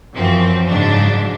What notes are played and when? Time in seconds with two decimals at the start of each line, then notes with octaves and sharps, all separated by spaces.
0.15 F#2 E3 F3 C4
0.67 G#2 C#3 F#3 D4